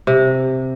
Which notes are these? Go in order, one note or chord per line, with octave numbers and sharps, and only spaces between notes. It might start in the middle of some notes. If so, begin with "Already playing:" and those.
C3